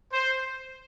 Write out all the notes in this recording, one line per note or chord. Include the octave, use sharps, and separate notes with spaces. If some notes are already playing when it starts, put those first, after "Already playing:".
C5